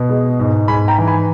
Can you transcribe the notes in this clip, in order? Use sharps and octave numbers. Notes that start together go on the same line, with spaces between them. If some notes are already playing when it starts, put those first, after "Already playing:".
Already playing: B2
G#3
G#2
G#2 G#5 B5
G5 A#5
E3
G#5 B5